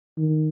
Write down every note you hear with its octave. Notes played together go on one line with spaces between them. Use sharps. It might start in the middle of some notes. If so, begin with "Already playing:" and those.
D#3